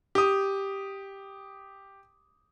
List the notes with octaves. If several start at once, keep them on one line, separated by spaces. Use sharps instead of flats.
G4 D#6